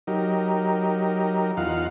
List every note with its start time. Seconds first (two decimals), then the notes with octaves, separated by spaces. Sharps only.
0.07 F#3 D#4 G4 A#4
1.57 E2 D#4 F4 F5 F#5